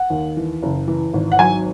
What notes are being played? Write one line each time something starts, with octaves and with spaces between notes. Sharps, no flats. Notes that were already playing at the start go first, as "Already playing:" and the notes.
Already playing: F#5
D#2
E3
F#1
E3
G#1
F#5
F#3 G#5